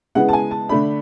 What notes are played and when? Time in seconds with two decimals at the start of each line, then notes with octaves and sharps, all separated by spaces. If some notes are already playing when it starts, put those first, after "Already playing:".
0.15 C#3 G#3 B3 E4 F#5
0.29 A5
0.33 G#5
0.51 A5
0.69 D3 A3 D4 B5